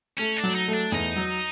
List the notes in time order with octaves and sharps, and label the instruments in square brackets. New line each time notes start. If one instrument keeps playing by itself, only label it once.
[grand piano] A3 [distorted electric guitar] C#4
[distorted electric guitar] D4
[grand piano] F#3
[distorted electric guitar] D#4
[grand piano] A3
[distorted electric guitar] D4
[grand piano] E2 [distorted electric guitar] D#4
[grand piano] F#3